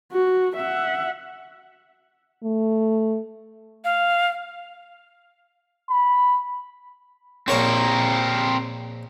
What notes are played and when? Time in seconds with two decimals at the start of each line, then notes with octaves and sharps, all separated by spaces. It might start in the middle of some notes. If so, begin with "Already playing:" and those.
0.12 F#4
0.56 E5 F#5
2.44 A3
3.85 F5
5.89 B5
7.48 A#1 C4 A#4 C5 C#5